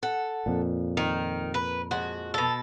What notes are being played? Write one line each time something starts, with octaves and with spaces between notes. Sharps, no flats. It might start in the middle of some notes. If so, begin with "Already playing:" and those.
A4 F#5
F2 A#2
D#3 A#4
B4
F3 G#3 F#4
B2 A4